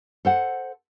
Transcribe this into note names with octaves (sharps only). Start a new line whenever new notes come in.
A4 C5 F#5